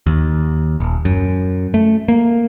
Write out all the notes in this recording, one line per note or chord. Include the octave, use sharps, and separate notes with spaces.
D#2
D#1
F#2
A3
A#3